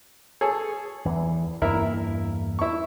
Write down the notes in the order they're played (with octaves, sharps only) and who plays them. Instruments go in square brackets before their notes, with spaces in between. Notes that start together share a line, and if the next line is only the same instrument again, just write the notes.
[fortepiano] G#4 A4 C#5
[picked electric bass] E2 E3
[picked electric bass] E2 G2 A#3 [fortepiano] E4 A#4
[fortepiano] E4 C#6